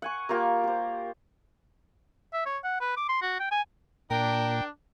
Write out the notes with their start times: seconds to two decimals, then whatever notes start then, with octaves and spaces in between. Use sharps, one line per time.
0.02 F#5 G#5 C#6
0.29 A#3 F4 G4 A#4
0.64 G4 C5
2.33 E5
2.46 C#5
2.64 F#5
2.80 B4
2.97 D6
3.08 C6
3.22 F#4
3.40 G5
3.51 G#5
4.10 A#2 D4 A#4 G5